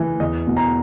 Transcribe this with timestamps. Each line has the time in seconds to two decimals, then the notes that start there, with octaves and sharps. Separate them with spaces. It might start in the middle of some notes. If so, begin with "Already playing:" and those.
Already playing: E3
0.20 E2 D#5
0.47 B2
0.57 A#5